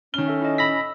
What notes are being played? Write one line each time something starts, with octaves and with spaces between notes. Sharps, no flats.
D#3 C#4 F6 G7
A4 E5
E4 D#5
B5 E6 A#6 B6